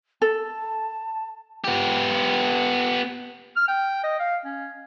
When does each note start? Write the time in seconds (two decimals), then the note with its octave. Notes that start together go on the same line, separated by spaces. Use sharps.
0.22 A4 A5
1.65 B3 G4
3.56 F6
3.68 G5
4.03 D#5
4.19 F5
4.45 C#4